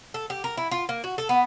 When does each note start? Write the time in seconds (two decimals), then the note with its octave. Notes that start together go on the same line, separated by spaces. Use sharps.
0.14 A4
0.30 G4
0.44 A#4
0.57 E4
0.71 F4
0.89 A#3
1.04 F#4
1.18 A4
1.29 B3